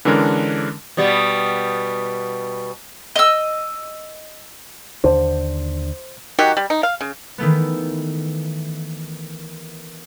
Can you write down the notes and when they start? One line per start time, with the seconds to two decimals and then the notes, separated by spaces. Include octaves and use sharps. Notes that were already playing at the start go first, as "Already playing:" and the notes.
0.05 D3 E3 G#3 C#4 D4 A#4
0.97 B2 G3 B3
3.16 D#5 E6
5.04 D#2 D3 D4 C5
6.39 D#3 F#3 F#4 G4
6.57 G3
6.70 D#4
6.83 F5
7.01 C#3
7.38 D#3 E3 A3 B3